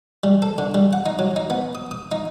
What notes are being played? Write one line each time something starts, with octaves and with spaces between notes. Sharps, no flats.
G3
A4
D3
G3
F#5
D#4
F#3
D#4
B3
D#6
D#6
D#4